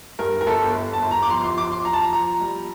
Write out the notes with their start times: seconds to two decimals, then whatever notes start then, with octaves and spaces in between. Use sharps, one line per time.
0.19 G2 A#4
0.41 A#4
0.47 G1 A4
0.74 G1
0.93 A5
1.02 G1
1.11 A#5
1.22 D6
1.30 F3 C6
1.44 C6
1.57 F3 D6
1.72 C6
1.85 F3 A#5
1.93 A5
2.02 A#5
2.13 F3 A#5
2.41 G3